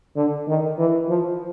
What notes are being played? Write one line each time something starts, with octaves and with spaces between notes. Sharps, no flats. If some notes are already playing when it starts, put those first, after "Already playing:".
D3
D#3
E3
F3